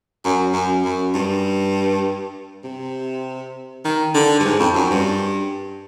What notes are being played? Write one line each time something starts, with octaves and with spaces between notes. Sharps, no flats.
F#2
F#2
F#2
G2
C3
D#3
D3
G2
G#2
F2
F#2
G2